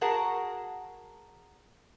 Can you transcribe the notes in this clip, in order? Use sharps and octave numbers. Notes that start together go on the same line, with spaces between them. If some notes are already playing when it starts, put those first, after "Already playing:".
F#4 G#4 A#4 F#5 A5